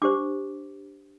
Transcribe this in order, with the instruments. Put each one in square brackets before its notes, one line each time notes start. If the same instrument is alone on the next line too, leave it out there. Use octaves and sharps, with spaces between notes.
[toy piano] D4 G4 C5 D6